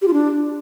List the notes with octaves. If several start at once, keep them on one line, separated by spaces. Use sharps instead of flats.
G4
F4
D4